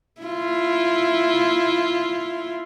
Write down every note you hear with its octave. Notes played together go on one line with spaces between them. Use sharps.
E4 F4